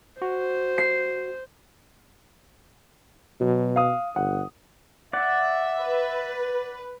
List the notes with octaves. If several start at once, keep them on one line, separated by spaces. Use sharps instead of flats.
F#4 C5
C7
B2 F#3
F5 D#6
G1 F#5
D5 E5 F#5
B4